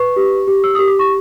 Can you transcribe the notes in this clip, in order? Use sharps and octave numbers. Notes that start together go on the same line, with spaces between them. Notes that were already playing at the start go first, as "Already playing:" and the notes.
Already playing: B4 C#6
G4
G4
E6
G4 D#6
D6
C#6